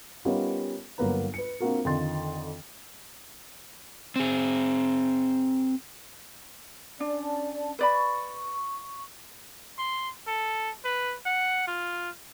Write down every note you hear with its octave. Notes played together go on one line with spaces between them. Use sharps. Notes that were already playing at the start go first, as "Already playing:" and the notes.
G3 B3 C#4 D#4 F4 A#4
G1 F#3 A#3 B3 B4 A#5
B4 C#7
A#3 C4 D4 F4 F#4 A#4
F2 D3 D#3 F4 C6 A6
C4 G#4
C#4 D4 D5 A5
B4 D5 B5 C#6
C6
A4
B4
F#5
F4